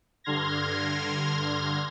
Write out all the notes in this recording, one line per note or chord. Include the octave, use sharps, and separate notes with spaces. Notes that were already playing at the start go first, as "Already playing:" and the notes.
G2 D3 C6 F6 G#6 A#6